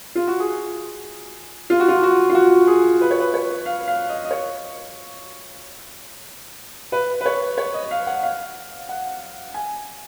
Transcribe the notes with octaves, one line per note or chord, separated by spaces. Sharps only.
F4
F#4
G#4
F4
F#4
F4
F#4
F4
F#4
G#4
B4
C#5
B4
C#5
F5
F5
D#5
D#5
C#5
B4
B4
C#5
C#5
D#5
F5
F#5
F5
F#5
G#5